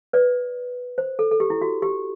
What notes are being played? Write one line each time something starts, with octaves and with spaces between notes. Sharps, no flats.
B4 D5
C5
A4
A4
G4
E4
F#4
G4